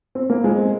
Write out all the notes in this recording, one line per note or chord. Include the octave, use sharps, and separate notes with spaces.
C4
A#3
G#3
C4